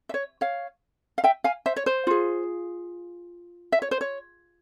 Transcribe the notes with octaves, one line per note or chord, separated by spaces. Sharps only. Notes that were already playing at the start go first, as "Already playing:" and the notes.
E5
C#5
C#5 F5
F5
E5 G5
F5 G#5
C5 E5
C#5
C5
F4 G#4
E5
C#5
C5
C#5